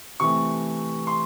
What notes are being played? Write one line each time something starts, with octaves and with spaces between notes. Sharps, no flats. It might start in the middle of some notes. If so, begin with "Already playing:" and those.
C3 E3 A3 C#6
C6